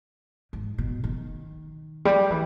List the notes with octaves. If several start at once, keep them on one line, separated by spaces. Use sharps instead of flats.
G#2
B2
D#3
G3
E3